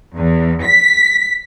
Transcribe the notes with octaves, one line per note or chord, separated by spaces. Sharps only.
E2
B6